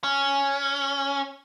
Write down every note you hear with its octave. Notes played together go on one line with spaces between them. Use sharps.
C#4